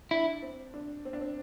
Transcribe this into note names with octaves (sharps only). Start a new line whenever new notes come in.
D4 E4
C4
D4
C4
D4
C4